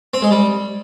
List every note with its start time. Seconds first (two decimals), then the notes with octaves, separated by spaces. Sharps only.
0.14 C4
0.22 G#3
0.31 G3